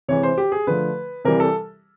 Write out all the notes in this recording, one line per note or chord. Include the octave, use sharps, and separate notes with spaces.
C3 E3 G#3 C#5
C5
G4
G#4
D3 F3 A3 B4
C3 E3 G3 A#4
A4